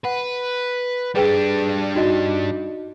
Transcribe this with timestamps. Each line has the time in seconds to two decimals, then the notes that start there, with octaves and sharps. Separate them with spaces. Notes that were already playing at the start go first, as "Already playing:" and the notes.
0.05 B4 F#5
1.16 G3 D4 G#4 B4 G5
1.95 D#4 F#4 D#5